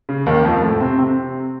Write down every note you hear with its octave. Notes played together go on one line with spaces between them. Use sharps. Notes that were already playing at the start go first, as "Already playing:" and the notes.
C#3
D#2 D#3
F2 F3
A2 A3
C3 C4
C3 C4